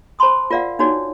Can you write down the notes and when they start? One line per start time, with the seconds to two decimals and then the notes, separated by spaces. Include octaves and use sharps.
0.19 C5 A5 B5 C6 D#6
0.51 F4 A#4 D5 F5 F#5
0.79 D4 D#4 F#4 C#5 D5